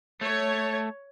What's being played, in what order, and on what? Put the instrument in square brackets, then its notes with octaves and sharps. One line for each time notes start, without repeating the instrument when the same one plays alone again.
[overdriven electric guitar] A3 [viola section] C#5